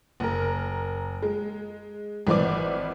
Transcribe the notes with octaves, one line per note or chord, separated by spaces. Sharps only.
F#1 A#4
G#3
G#1 E3 B4 C5 D5 D6